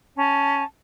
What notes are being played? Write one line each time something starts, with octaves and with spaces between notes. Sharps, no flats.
C#4 A5